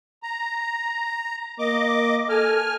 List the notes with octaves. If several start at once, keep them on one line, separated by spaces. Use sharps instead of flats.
A#5
A#3 D#5 D6
A4 G#5 F6